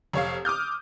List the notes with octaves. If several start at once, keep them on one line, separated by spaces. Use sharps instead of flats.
F1 C#5 F5
D6 D#6 F6 G6